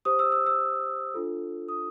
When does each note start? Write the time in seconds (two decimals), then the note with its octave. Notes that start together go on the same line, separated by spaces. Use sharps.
0.05 G4 C5 D#6
0.19 E6
0.32 E6
0.47 E6
1.14 D4 F4 A4
1.68 D#6